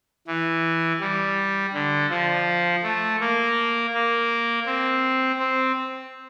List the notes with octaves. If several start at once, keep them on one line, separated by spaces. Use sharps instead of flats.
E3
G3
D3
F3
A3
A#3
A#3
C4
C4